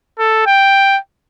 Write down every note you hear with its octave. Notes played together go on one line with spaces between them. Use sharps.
A4
G5